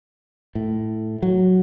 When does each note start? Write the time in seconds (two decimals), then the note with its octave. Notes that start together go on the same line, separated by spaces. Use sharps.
0.55 A2
1.22 F#3